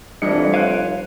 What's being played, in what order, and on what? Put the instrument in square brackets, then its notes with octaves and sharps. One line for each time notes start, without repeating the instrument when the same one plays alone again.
[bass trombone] F1 [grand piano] E3 A4 C#7 [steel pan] G3 D4 D#5
[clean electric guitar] C5 C#5 F5 [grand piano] F#6 D7 D#7